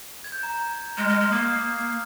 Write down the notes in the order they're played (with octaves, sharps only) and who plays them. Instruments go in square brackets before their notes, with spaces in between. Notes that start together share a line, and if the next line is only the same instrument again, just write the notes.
[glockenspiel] G#6
G6
A#5
A#5
[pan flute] G#3 [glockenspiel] F6
[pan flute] G#3
G#3
[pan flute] A#3 [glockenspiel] D#6